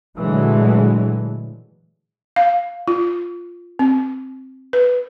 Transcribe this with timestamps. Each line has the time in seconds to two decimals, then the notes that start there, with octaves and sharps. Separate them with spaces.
0.17 A#2 D3 E3 F#3 G#3 A3
2.36 F5
2.88 F4
3.79 C4
4.73 B4